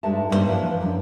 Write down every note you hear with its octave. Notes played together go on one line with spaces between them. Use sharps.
G2 G#3 A3 D#4 E5 A5
G2 A#2 G#3 D#4 C5 C#5
E3 F3 D4 E4
F#2